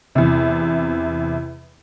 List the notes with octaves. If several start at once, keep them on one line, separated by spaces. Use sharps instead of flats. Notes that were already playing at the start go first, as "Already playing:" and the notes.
E2 C3